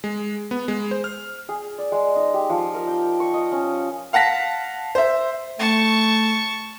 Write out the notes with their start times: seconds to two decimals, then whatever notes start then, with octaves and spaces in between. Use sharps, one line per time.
0.04 G#3
0.51 B3
0.68 G#3
0.91 C5
1.04 F6
1.49 G#4
1.78 D5
1.92 G#3
2.16 D#4
2.34 G4
2.50 F3
2.74 A#4
2.88 G5
3.20 C#6
3.34 D#5
3.52 C#4
4.13 F5 F#5 A5 A#6 B6
4.95 C5 E5
5.59 A3 A5 C#6